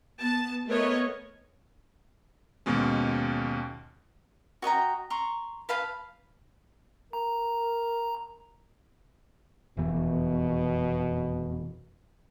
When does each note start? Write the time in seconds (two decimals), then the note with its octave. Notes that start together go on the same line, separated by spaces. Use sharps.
0.20 B3 A5
0.69 A3 B3 A#4 C#5 D#5
2.66 D#2 G#2 B2 G#3 C#4
4.62 F#4 D#5 G5 A#5
5.10 A#5 C6 C#6
5.69 B4 F5 A5 B5
7.13 A#4 A#5
9.77 F1 E2 B2 E3